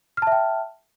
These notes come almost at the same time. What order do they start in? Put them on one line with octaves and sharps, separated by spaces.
F6 A5 E5 G5